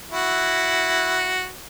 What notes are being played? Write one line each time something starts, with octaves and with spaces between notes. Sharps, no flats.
E4 F#4